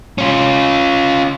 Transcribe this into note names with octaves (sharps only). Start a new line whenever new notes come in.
C#4 F4